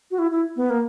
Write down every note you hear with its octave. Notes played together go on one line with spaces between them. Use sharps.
F#4
E4
E4
B3
A#3